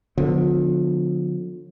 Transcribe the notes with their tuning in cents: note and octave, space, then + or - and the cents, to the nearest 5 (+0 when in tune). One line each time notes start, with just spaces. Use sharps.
D3 +0 F3 +35 B3 +25